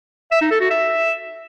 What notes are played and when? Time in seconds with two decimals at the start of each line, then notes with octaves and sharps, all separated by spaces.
0.32 E5
0.41 D#4
0.51 A4
0.60 F#4
0.70 E5